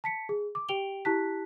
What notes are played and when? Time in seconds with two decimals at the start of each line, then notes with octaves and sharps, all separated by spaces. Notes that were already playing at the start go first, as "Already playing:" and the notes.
0.04 A5 B6 C#7
0.29 G#4
0.55 D6
0.69 G4 G5 D7 F7 G7
1.05 E4 G4 A5 F#6 B6